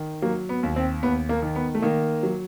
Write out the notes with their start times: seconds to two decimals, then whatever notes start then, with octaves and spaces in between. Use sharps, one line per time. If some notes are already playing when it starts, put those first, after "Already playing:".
Already playing: D#3
0.22 F#3 A#3
0.49 B3
0.63 D#2
0.76 C4
1.03 D#2 B3
1.29 A#3
1.42 D#3
1.55 B3
1.75 A3
1.82 D#3 A#3
2.23 F#3